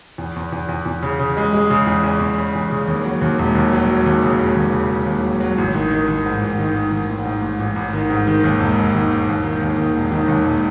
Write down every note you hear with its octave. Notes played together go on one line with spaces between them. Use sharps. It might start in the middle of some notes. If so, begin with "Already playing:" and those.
E2
E2
E2
E2
E2
C#3
C#3
G#3
G#3
C#3
E2
E2
E2
C#3
E2
C#3
D#2
F#3
D#2
E1
D#2
F#3
F#3
D#2
C#3
E1
D#2
C#3
C#3
D#2
F#3
F#3
A1
D#3
D#3
D#3
G#2
A1
D#3
D#3
D#3
A1
G#2
A1
A1
A1
D#3
G#2
D#3
D#2
E1
E1
D#3
E1
D#2
D#3
D#2
D#3
E1
D#3
D#2
E1